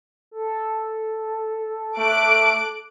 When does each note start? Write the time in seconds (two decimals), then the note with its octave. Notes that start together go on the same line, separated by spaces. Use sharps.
0.31 A4
1.98 A3 D6 F#6 D7